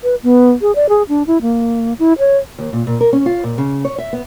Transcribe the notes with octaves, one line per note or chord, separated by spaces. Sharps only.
B4
B3
G#4
D5
G#4
D4
E4
A#3
E4
C#5
D#2
A#2
A#2
A#4
C#4
F4
A#2
C#3
C#5
E5
B3